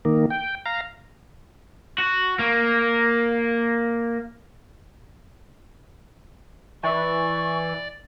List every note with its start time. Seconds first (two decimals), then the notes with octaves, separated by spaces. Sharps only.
0.05 D#3 A#3
0.30 G5
0.66 F5 A#5
1.98 F#4
2.39 A#3
6.83 E3 D5 C#6